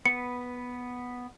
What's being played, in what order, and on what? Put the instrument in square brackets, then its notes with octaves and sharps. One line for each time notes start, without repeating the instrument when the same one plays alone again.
[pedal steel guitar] B3 B4 [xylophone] C#7